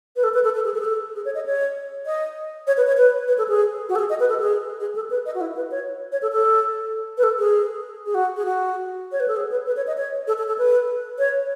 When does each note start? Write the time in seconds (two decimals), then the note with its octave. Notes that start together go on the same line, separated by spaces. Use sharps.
0.16 B4
0.24 A4
0.34 B4
0.44 A4
0.54 A4
0.65 G#4
0.74 A4
0.80 G#4
0.85 A4
1.16 G#4
1.25 C#5
1.35 D#5
1.46 C#5
2.06 D#5
2.67 C#5
2.77 B4
2.87 C#5
2.97 B4
3.28 B4
3.38 A4
3.48 G#4
3.89 F#4
3.95 A4
3.99 G#4
4.10 D#5
4.20 B4
4.29 A4
4.40 G#4
4.80 G#4
4.95 A4
5.10 B4
5.26 D#5
5.35 F#4
5.41 E4
5.56 B4
5.71 C#5
6.12 C#5
6.22 A4
6.32 A4
7.18 B4
7.23 A4
7.39 G#4
8.06 G#4
8.15 F#4
8.36 G#4
8.45 F#4
9.12 C#5
9.20 B4
9.28 A4
9.36 G#4
9.52 B4
9.66 B4
9.77 C#5
9.87 D#5
9.97 C#5
10.27 A4
10.38 A4
10.48 A4
10.58 B4
11.19 C#5